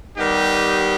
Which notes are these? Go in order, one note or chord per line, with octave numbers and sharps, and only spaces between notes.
D#3 G3 B3 D#4 G4